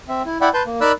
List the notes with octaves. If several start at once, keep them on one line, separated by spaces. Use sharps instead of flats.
C4 E5
E4
E4 D5 E5 F#5 G5 B5
B4 A5 C6 G6
A#3
D#4 A#4 D5 B5 E6 F#6